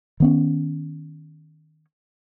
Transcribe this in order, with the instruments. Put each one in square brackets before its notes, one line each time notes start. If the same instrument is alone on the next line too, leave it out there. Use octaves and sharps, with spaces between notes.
[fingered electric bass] D#3 B3 C#4